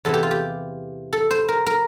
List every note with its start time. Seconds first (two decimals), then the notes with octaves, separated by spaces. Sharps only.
0.05 E2 C3 E3 A4
0.14 G4
0.23 F4
0.31 G4
1.13 A4
1.31 C5
1.48 A#4
1.66 A#4